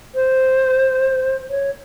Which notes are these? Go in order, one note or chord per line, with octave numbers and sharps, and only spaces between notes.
C5
C#5